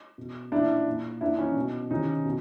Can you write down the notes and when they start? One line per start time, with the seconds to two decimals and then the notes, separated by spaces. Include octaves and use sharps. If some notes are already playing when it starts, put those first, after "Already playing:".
0.18 B2
0.52 A#2 D4 E4
0.87 A#2
1.21 A#2 D4 E4
1.39 C#4 D#4
1.56 B2
1.91 C3 D#3 C#4 D#4
2.25 B2